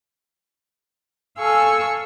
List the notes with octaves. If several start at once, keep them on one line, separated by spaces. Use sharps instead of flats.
A4 F5 G#5 C#6 E6